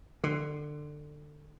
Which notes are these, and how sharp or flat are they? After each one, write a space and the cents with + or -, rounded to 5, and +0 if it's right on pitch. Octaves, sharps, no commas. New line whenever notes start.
D3 +20